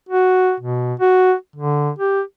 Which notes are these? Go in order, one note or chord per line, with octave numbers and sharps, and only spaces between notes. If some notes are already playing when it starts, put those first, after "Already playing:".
F#4
B2
F#4
D3
G4